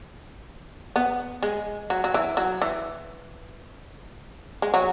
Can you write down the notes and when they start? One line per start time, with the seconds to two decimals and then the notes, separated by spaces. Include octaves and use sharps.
0.96 B3
1.43 G#3
1.90 F#3
2.04 F#3
2.14 E3
2.37 F#3
2.62 E3
4.62 G#3
4.74 F#3